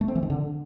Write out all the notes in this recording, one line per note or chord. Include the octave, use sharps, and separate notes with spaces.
A3
C4
E3
D#3
D3